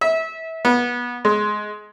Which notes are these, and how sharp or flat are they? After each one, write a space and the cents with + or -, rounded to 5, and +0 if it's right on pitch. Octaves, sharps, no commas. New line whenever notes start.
E5 -25
B3 -25
G#3 +15